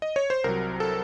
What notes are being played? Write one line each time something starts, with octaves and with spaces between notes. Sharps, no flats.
D#5
C#5
C5
C2 C3 F#3 A#4
A4